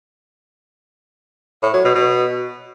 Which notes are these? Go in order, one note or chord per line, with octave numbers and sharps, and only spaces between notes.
A2
F#3
B2
B2